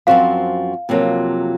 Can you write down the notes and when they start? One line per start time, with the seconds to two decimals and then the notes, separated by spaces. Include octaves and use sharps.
0.07 F#2 F3 C4 F#4 F5
0.89 F2 C3 F#3 A#3 F4